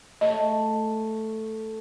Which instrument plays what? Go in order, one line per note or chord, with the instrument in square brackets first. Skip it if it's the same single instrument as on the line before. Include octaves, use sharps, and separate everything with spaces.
[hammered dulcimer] A3 [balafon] D#5